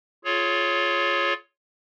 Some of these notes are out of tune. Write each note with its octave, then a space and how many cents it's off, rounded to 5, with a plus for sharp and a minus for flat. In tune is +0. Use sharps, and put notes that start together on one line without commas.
F4 +0 G#4 +30 C#5 +0